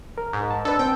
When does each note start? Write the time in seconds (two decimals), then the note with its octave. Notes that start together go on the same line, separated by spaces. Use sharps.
0.18 A#4
0.33 G#2
0.51 A5
0.65 D4 A4 B4
0.79 C4 G5